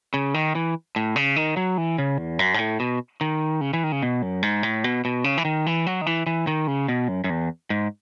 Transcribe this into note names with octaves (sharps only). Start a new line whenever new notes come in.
C#3
D#3
E3
A2
C#3
D#3
F#3
E3
C#3
E2
F#2
G#2
A2
B2
D#3
C#3
E3
D#3
C#3
B2
F#2
G#2
A2
B2
B2
C#3
E3
D#3
E3
F#3
D#3
E3
E3
D#3
C#3
B2
F#2
F#2
E2
G#2